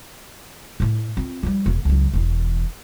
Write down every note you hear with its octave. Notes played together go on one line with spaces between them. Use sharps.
A2 A3
C4 F4
F3 G3
E1 A#3
C#2 F#3
E1 E3